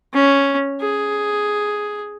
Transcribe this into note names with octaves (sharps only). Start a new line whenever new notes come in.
C#4
G#4